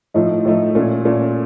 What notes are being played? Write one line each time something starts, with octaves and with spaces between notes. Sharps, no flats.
A2 F3 A3 D#4
A2 F3 A3 D#4
A#2 A3 C#4
A#2 A3 C#4